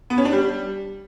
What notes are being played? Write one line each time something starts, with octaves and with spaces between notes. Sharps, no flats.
B3
C#4
D4
G3